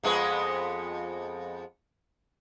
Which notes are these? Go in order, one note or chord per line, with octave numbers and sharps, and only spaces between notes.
F2 G#3 B3